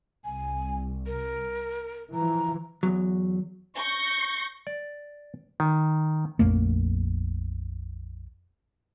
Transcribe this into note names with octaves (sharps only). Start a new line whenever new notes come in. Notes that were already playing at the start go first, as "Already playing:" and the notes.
C2 G#5
A#4
E3 F3 A#5
E2 F#3
C#6 G6 A#6
D5
D#3
A#1 F2 A3 A#3